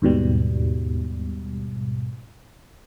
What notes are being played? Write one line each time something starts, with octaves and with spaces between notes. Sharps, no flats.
D#2 G#2 B2 G3